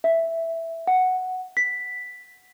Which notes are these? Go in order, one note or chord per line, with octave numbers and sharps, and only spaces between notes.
E5
F#5
B6